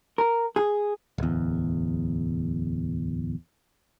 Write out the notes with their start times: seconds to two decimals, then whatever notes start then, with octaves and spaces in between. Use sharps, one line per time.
0.18 A#4
0.56 G#4
1.18 D1 E2